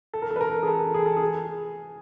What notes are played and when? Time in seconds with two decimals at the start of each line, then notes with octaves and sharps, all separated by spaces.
0.14 A4
0.22 A#4
0.31 A4
0.36 B4
0.41 A#4
0.63 G#4
0.67 A4
0.94 G#4
1.06 A4
1.17 G#4